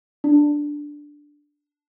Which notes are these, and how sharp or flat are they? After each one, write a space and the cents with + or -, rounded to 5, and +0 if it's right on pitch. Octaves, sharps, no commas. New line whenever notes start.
D4 +0